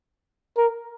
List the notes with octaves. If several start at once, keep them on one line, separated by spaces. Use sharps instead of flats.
A#4